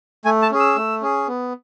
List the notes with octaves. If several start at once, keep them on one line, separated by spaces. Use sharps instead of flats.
A3 G#5
A5
C#4 G#4
E6
A3
C#4 G#4
B3